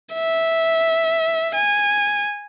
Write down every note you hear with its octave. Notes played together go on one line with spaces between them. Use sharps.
E5
G#5